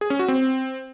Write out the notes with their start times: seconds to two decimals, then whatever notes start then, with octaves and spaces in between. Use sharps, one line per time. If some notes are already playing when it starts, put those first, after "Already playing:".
0.01 G#4
0.10 C#4
0.19 F#4
0.28 C4